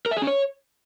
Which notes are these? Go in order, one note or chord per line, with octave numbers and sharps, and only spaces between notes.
A#4
E5
G#4
C#4
C#5